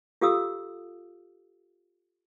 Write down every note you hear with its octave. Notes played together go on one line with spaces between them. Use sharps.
F4 G4 A4 F5 D#6 E6